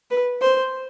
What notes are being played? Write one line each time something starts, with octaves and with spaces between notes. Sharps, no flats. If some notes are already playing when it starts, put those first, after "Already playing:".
B4
C5